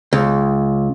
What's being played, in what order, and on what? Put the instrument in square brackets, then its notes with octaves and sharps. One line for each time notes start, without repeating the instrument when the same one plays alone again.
[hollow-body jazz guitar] C#2